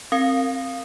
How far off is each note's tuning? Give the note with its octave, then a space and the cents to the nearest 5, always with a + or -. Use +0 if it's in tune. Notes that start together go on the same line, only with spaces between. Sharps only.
C4 +20 A#4 -20 F5 +0